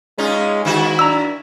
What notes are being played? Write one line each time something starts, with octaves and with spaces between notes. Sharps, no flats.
G#3 C#4 D#4 F4
G#2 D#3 E4 F#4
D4 A#5 E6